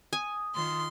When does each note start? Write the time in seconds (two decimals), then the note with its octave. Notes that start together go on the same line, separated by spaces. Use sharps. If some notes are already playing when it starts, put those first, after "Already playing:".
0.13 G#5 D#6
0.55 D#3 F4 C6